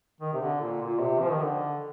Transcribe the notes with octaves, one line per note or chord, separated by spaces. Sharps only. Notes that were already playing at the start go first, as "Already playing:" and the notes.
D#3
C3
D3
A#2
A#2
C3
F3
D#3
D3